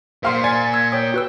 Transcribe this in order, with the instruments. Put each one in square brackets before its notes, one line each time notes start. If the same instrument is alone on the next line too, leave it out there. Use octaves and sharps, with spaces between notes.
[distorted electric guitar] A#2 [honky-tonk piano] C5 F5 C6
[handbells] D5 [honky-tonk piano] G#5 [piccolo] A6
[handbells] E6 [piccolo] G#6
[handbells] C#5 D#6 [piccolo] G5
[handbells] F#4 B4 E6